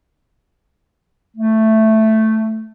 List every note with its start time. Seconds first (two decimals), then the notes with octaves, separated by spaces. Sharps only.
1.37 A3